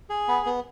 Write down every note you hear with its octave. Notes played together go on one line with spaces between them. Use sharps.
G#4
B3
B3